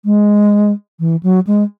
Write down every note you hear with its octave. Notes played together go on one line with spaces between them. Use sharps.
G#3
E3
F#3
G#3